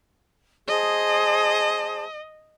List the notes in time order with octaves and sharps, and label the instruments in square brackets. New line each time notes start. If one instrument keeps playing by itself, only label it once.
[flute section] G#4 C5 A5 [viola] D#5